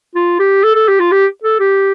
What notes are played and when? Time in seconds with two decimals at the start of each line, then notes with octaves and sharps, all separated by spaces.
0.15 F4
0.40 G4
0.64 A4
0.75 A4
0.88 G4
1.00 F4
1.12 G4
1.44 A4
1.60 G4